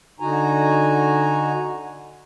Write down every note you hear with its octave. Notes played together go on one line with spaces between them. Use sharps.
D3 D#4 F#4 G#5 A#5